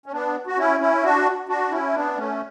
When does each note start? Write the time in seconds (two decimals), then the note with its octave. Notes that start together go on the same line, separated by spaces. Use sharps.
0.06 C#4
0.12 B3 D4
0.47 F#4
0.57 C#4 E4
0.80 C#4 E4
1.03 D4 F#4
1.49 D4 F#4
1.72 C#4 E4
1.94 B3 D4
2.18 A3 C#4